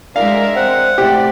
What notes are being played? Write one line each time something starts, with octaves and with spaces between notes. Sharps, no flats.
G#3 D4 A#4 E5 F5
C4 F#5
A2 C3 G4 D5